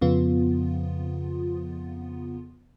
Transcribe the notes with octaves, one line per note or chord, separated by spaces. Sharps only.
F2 C#3 F3 B3 F4